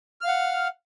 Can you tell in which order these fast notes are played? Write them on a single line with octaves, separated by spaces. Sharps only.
F6 F5 F#5